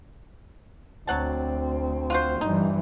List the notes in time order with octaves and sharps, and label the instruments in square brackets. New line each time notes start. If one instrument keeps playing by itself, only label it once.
[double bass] D2 C4 [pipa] F#3 F#5 A5
[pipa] F4 F#4 C5
[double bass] G2 E3 [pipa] D#4